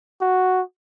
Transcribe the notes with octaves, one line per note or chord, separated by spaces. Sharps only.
F#4